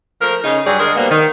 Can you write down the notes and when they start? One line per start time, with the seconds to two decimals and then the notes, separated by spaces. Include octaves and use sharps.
0.21 F3 A3 A#4
0.44 C#3 D#4
0.65 G2 F#3 G3 G#4 D5
0.80 D3 G#3 G#4 A#4
0.96 B2 F3 G3 A#3 B3
1.10 D#3